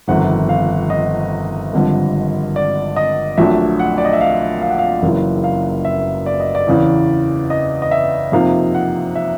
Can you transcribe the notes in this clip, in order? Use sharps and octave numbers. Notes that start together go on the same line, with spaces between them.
G1 F2 C3 D#3 F#5
F5
D#5
G#1 G2 D3 F3
D5
D#5
A#1 A#2 F#3 A3 D4 E5
F#5
D5
D#5
E5
F5
F5
F#5
F5
F#1 F#2 C#3 E3
F5
E5
D5
D#5
D5
E2 C#3 E3
D#5
D#5
E5
F2 C3 F3 A#3 D#4 F5
F#5
E5